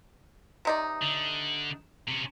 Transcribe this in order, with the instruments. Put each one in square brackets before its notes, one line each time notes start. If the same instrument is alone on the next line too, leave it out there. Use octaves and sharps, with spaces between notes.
[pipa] C3 D#4 D5
[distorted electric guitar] D3
C3 C#4